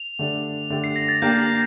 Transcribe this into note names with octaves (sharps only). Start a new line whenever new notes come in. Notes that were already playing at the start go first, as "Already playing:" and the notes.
Already playing: F7
D3 A3 D4 G4 D5
D3 A3 D4 G4 D5
C7
A#6
A6
A#3 D4 G4 G6
A#6